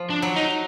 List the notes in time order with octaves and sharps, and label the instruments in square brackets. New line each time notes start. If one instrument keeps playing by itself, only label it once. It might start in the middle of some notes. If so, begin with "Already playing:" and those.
Already playing: [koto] F3
[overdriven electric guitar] D4
[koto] F#3
[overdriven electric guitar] D#4